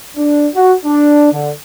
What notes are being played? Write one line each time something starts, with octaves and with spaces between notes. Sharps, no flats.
D4
F#4
D4
D3